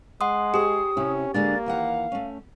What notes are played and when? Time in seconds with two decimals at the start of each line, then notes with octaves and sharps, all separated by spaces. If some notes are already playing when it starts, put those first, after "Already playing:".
0.21 G#3 F#5 C6 D#6
0.54 G4 G#4 C5 D#6
0.97 C3 C#4 E4
1.34 D3 G#3 A#3 D4 A6
1.66 D#2 E3 F5 F#5
2.12 A3 C#4